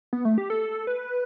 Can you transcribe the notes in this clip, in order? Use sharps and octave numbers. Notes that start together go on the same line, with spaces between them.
B3
A3
G4
A4
B4